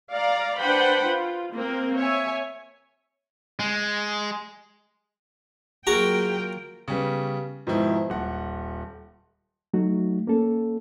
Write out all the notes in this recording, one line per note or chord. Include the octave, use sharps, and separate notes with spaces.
D5 F5 A#5
D4 B4 C5 F#5 G5 B5
F4
A#3 C4 A#4
C#5 E5 G#5
G#3
F#3 A#3 F4 F#4 G#4 A#4 G5 A#5
C#3 G3 B3
G#2 B2 D#3 F3 E4
D#1 F#5
F#3 A3 D#4 F#4
A#3 C#4 A4